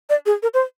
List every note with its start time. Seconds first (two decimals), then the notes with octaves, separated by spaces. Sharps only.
0.10 D5
0.26 G#4
0.43 A#4
0.54 C5